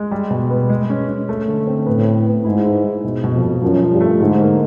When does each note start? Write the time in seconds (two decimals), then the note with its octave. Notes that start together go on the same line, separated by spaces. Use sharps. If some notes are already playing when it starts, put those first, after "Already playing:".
Already playing: G#3
0.11 G3
0.31 B2
0.50 B3
0.69 G#3
0.90 C#4
1.08 C#4
1.29 A3
1.48 D3
1.67 C4
1.86 A2 B3
2.06 B3
2.26 B3
2.45 G#2 E4
2.65 E4
2.84 G#3
3.04 B2
3.24 B2
3.33 F2
3.43 B2
3.62 F#2 F3
3.82 F3
3.91 G2
4.01 A3
4.20 G#2 D3
4.41 A#3